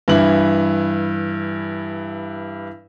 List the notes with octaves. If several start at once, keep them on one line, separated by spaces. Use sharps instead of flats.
G2 E3 E4 F#7